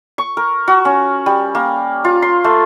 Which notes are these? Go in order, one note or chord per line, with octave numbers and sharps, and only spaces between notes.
C#6
A#4
F#4
C#4
G3
A#3
F4
C6
A3